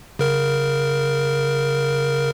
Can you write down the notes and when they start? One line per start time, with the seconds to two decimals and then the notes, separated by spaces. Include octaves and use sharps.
0.19 C#3 A#4